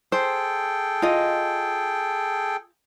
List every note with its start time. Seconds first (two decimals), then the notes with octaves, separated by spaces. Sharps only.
0.12 G#4 A4 C5 G5
1.02 F4 D#5